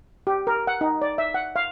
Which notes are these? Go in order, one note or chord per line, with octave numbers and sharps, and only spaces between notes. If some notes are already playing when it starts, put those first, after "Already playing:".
G4
A#4
F#5
D#4
D5
E5
F#5
F5